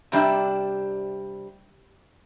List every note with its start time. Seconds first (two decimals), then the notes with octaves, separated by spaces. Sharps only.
0.12 C3 G3 D4 E5